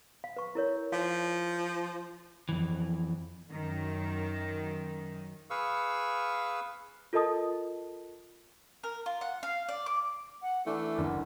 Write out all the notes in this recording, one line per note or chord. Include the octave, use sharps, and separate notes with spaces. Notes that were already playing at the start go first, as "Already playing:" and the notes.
F5
B4 C#6
E4 A#4 C#5
F3 F5
F2 E3
F#2 D#3
G#4 B4 F5 C#6 E6
F4 A4 A#4 D#5 A5 D#6
A#4
F4
F#5
F5
D5
D6
F#5
E3 A3 D4
F#1 D2 D3